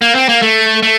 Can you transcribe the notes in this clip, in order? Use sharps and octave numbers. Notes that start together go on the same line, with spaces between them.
A#3
C4
A#3
A3
A3